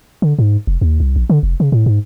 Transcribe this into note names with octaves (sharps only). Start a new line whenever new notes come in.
D3
G#2
F1
D#2
C2
A#1
D3
F1
C#3
A2
G#2